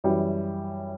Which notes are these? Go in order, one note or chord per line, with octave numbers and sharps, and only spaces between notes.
F#2 E3 G3